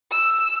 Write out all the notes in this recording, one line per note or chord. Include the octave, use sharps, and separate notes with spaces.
E6